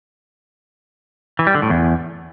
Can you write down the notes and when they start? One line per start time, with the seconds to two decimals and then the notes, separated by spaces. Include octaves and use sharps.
1.39 E3
1.47 G3
1.55 D3
1.62 A2
1.70 E2